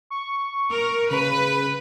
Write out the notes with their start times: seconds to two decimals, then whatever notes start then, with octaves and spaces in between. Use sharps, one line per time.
0.10 C#6
0.70 A#4
1.11 C#3 B4